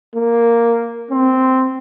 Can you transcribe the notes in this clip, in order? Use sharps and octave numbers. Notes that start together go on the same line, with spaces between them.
A#3
C4